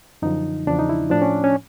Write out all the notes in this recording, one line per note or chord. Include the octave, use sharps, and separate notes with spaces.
F#2 D3 F3 D#4
E2 C#3 F3 D4
D#4
E4
A2 F3 D4
C#4
C#4